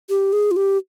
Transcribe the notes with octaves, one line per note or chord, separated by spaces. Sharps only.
G4
G#4
F4
G4